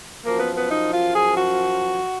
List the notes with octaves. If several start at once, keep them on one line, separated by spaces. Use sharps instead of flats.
F#2 F3 A#3
B3
B3
D#4
F4
G#4
F#4